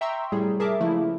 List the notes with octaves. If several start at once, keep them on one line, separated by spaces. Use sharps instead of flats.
E5 G5 A#5 C6 C#6 E6
A2 C3 G3 G#4
G#4 A#4 E5 A5 D6
C#3 F3 A3 A#3 E4